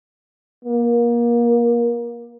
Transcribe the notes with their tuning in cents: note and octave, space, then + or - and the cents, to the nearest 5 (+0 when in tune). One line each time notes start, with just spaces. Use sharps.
A#3 +25